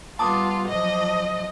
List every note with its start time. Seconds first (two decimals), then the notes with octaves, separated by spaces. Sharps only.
0.19 G3 B3 F4 A5 D6 D#6
0.68 F3 F#3 D#5